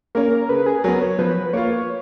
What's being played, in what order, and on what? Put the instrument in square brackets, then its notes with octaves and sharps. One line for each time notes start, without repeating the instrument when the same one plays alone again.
[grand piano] A#3 C#4 [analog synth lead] A#4
[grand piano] C#3 [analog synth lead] B4
[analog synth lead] G#4
[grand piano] F#3 B3 [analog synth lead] A#4
[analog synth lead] C#5
[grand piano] F3 [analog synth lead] B4
[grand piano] A#3 F4 [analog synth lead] C#5